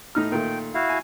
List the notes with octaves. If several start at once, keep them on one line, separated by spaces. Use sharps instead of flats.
A2 D#4 F6
A#2 D#3 A3 G5
E4 F#4 F5
G#5